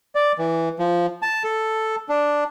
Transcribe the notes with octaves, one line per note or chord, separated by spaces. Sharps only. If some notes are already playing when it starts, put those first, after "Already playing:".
D5
E3
F3
A5
A4
D4